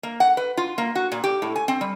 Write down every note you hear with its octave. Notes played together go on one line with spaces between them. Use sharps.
A#3
F#5
B4
F4
A#3
F#4
A#2
G4
A2
G#5
C4
G3